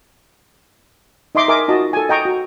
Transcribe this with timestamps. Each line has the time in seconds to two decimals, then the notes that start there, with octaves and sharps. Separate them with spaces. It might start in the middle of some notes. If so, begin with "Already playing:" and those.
1.35 D#4 D#5 E5 C6 D6
1.48 A#4 D#5 E5 G#5 D6
1.68 D#4 F4 F#4 D#5 A5
1.93 A4 G#5
2.09 D#5 G5 A#5 C#6 D#6
2.25 F#4